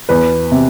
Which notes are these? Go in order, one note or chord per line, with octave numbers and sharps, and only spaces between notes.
E2 B4
C3